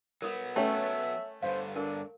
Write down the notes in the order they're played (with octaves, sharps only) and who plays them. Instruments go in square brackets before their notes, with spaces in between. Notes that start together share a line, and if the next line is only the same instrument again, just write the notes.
[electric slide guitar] F#3 B3 [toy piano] A#4 D#6
[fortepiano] A3 C#4 [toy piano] C#5 G5 A#5 [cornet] E5
[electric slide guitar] G2 D3 [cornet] C5 [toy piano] F5
[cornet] D4 [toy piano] A#4